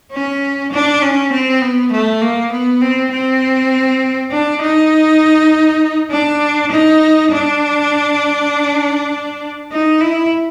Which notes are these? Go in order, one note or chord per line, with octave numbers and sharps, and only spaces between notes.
C#4
D4
C#4
C4
B3
A3
A#3
B3
C4
C4
D4
D#4
D4
D#4
D4
D#4
E4